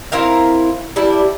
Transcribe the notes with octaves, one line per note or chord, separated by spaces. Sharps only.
C4 E4 A#4 F5
G3 D4 E4